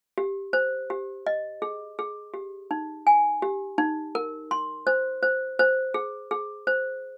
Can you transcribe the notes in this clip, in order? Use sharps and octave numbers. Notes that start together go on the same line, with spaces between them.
G4
C5
G4
D#5
G#4
G#4
G4
D#4
G#5
G4
D#4
A#4
C6
C5
C5
C5
G#4
G#4
C5